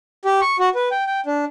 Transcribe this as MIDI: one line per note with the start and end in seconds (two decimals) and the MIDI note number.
0.25 0.40 67
0.41 0.56 85
0.59 0.69 66
0.75 0.89 71
0.91 1.04 79
1.06 1.20 79
1.26 1.45 62